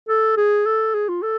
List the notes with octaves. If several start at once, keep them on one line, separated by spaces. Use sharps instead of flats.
A4
G#4
A4
G#4
F4
A4